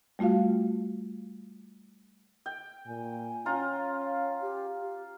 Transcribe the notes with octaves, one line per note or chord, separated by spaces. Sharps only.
G3 A3 F4 F#4 F5
G5
A#2 G#5
C#4 F4 A#5
F5
G4
G4